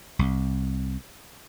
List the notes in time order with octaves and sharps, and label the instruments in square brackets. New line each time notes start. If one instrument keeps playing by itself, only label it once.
[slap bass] C2